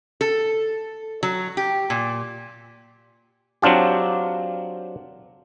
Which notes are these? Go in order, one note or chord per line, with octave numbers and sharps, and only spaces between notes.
A4
F#3
G4
A#2
F#3 C4 D4 F4 G4